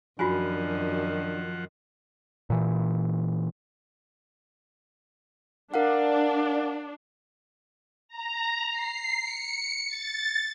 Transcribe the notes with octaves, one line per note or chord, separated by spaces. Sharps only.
F#2 D#3 F3 D4 F4 F#4 F#5 G#5
A#2 E3
D4 A#4 F5 F#5
A#5
C7
C#7
A6